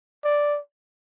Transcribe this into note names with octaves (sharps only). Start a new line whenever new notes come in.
D5